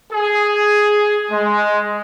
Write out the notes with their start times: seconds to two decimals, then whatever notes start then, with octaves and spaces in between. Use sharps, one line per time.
0.12 G#4
1.31 G#3